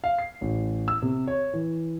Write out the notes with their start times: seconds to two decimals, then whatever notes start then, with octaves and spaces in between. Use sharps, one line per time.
0.04 F5
0.19 C7
0.41 A1
0.88 E6
1.02 C3
1.27 C#5
1.53 E3